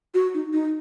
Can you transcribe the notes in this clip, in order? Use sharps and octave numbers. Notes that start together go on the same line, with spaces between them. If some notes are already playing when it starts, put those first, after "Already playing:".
F#4
D#4
D#4